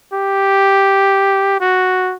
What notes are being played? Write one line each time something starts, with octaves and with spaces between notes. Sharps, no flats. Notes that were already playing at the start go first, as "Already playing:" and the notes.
G4
F#4